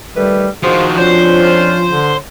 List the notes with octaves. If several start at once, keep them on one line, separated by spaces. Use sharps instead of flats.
D#3 G3 A3 B4
D#3 F3 F#4 G#4 C5 F5
F2 F3 C#4 D4 C5
F4
D3